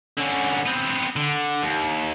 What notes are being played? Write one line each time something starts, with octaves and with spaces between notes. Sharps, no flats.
D3 C#4
B3 C4
D3
D#2